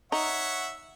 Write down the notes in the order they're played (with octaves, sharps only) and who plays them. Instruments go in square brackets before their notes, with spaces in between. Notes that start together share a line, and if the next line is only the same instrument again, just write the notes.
[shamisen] D#4 [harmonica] C#5 E5 F#5